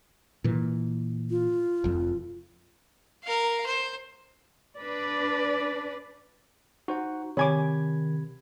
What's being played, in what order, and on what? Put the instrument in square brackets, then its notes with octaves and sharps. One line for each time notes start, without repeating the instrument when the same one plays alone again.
[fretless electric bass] A#2 E3
[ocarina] F4
[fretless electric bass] F1 F2
[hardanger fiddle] A#4 F5
C5
[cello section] D4 B4 [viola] D5
[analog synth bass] D#4 [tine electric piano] F#4 C5 F#5
[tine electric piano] C3 B5 G#6 [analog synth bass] D#3 [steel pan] C#5 G#5 D6